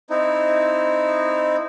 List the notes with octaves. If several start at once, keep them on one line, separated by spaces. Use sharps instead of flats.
C4 D#4 E4